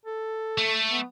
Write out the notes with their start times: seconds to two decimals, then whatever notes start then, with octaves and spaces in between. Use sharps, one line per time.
0.05 A4
0.58 A3
0.91 B3